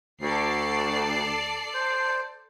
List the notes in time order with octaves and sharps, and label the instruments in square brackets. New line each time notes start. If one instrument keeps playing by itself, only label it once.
[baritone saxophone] D2 [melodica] F#4 [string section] A4 D5 C7
[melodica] D6
C5